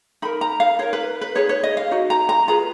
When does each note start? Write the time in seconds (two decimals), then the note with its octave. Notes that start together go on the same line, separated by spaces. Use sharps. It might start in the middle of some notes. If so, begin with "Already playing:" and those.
0.22 D#4 A#4 B5
0.41 A#5
0.60 F5
0.79 D#4 A#4 C#5
0.93 B4
1.21 B4
1.35 D#4 G#4 B4 C#5
1.49 C#5
1.63 D#5
1.77 F5
1.91 D#4 F#4
2.10 A#5
2.29 A#5
2.48 F4 G#4 B4 A#5